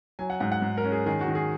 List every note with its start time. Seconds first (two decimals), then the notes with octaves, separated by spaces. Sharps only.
0.19 F#3 G#5
0.30 F#5
0.40 G#2 F#5
0.52 F#5
0.62 G#2
0.77 A#4
0.84 C#4
0.92 G#4
1.06 D#3 G#4
1.21 F#4
1.28 D#3
1.35 G#4